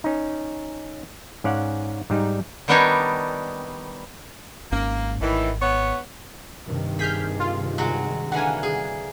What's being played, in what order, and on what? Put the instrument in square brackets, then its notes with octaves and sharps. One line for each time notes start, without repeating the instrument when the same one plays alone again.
[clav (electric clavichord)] C#4 D#4
G#2 C#4 D5 F5 F#5
G#2 G3 D#4
[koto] D#3 G3 B3 D4 D#4 C#5
[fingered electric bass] G#1 G#2 C#4 [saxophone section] A#3
[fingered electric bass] G#1 [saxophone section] A2 D#3 E3
[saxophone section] B3 C#5
[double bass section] G2 C3 D#3
[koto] G#4 [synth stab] F6 G6 B6
[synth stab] F4
[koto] F#3 G#3 F#4
[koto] D3 E3 A#3 [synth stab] F#5 G#5
[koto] G#4